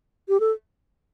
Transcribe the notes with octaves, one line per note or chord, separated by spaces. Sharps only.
G4
A4